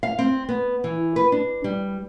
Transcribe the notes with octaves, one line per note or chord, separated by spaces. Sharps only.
F5
C4
B3
E3
B4
D4
G3